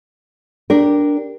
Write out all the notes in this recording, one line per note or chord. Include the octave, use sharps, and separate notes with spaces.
D4 G4 A#4